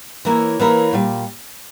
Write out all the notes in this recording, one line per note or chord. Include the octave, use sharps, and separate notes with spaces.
E3 A#3 E4 A#4 C#5
E3 A#3 E4 A#4 C#5
A#2 G3